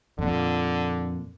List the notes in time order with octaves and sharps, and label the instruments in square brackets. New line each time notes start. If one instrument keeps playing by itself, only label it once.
[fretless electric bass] F2 A#2 [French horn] D3